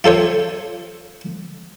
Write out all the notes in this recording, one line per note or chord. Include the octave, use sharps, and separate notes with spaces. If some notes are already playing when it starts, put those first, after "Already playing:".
F4 A4 C5 C#5